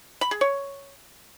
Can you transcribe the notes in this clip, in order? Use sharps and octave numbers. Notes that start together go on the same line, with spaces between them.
B5
G#4
C#5